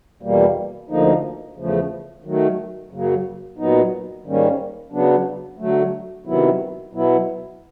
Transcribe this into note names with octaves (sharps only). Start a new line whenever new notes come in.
E2 B2 G3 A#3
D2 D3 F3 A#3 D#4
E2 C#3 F3 A3
D#3 F#3 A3
F#2 C#3 F#3 A#3
A#2 F#3 B3 D#4
G#2 D#3 G3 A#3 C#4
C#3 F#3 B3 D4
D3 F#3 A3
C3 D#3 F#3 B3 E4
B2 F#3 B3 E4